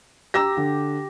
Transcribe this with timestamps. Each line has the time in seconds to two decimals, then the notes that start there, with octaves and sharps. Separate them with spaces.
0.34 G4 A#5 E6 A#6
0.57 D3